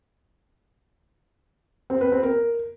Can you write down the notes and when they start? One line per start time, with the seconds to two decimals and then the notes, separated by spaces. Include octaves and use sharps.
1.90 C4
2.01 B4
2.12 C4
2.23 A#4